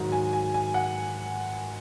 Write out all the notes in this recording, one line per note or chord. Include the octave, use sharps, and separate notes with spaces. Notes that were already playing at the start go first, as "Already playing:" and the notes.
Already playing: G#2 D#3 F#3
G#5
G#5
G#5
F#5